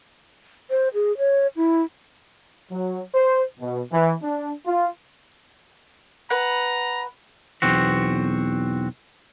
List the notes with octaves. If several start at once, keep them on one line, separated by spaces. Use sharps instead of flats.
C5
G#4
C#5
E4
F#3
C5
B2
E3
D4
F4
B4 F#5 A#5
B1 E2 C4 F#4